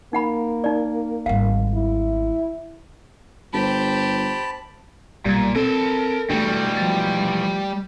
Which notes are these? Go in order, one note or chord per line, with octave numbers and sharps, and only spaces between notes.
A#3 D#4 F#5 B5
D#4 D5
G#1 G3 F5 F#5
E4
G1 G4 C5 A5 B5
B1 A#2 G3 G#6
C4 A4 A#4 A5
E3 G3 A3 D4 F#4
F3 A6